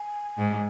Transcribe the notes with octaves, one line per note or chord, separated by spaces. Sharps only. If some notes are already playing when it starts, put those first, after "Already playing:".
Already playing: G#5
G#2